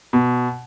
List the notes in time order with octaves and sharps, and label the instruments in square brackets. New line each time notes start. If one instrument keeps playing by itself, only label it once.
[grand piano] B2